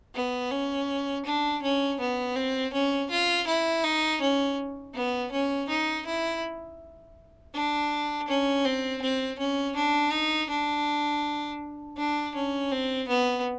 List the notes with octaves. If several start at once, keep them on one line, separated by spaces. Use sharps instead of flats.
B3
C#4
D4
C#4
B3
C4
C#4
F4
E4
D#4
C#4
B3
C#4
D#4
E4
D4
C#4
C4
C4
C#4
D4
D#4
D4
D4
C#4
C4
B3